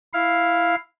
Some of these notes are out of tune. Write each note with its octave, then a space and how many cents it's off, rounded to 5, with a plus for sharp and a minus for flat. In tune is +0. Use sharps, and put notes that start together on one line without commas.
E4 +5 F5 +0